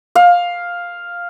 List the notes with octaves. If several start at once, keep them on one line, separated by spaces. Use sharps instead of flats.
F5